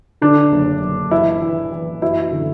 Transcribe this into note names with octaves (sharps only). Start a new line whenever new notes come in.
D3 D4
F#1
F#1
E3 E4
E3
E3
F#2 E4
D3